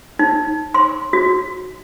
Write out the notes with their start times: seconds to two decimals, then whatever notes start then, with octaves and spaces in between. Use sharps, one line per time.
0.19 D#4
0.74 C6
1.13 F#4